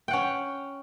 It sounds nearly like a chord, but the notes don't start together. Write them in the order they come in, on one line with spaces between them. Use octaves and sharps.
G5 F#5 C#4